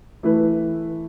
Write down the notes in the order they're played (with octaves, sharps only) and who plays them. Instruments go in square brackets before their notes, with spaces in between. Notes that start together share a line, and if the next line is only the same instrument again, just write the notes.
[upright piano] E3 A3 E4 B4